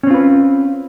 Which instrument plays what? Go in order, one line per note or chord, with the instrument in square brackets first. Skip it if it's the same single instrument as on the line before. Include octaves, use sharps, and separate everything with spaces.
[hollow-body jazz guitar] C#4
C4
F4
B4